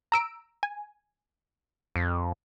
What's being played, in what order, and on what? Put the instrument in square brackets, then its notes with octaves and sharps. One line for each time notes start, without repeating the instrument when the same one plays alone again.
[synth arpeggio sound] A#5 E6 D7
G#5
[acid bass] F2